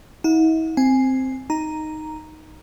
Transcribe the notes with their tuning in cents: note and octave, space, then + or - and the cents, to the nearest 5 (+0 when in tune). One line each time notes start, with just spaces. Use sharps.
E4 -45 F#5 -45
C4 +0 G#5 +0
D#4 +0 A#5 +0